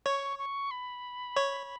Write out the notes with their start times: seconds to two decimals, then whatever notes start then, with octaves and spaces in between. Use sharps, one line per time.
0.06 C#5 C#6
0.39 C#6
0.71 B5
1.36 C#5